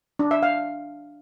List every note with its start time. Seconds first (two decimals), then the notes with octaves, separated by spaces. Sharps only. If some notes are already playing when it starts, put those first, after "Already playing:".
0.19 D4
0.31 E5
0.43 F5